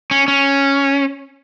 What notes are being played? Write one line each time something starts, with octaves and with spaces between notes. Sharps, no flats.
C#4
C#4